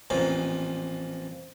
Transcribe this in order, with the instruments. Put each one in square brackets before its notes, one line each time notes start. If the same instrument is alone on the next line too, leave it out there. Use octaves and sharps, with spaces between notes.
[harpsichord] A1 F2 A#2